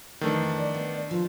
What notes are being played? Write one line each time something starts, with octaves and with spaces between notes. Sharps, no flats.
F2 D#3 E3 A3 D4
D5
B3
F3 G#3 F4